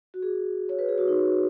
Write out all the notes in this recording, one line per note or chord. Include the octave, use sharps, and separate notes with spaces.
F#4
G#4
C#5
B4
G#4
F#4
D#4